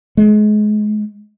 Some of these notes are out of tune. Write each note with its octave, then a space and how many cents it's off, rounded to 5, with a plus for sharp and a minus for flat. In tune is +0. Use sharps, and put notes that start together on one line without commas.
G#3 +30